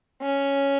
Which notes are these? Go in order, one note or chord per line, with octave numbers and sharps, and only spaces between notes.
C#4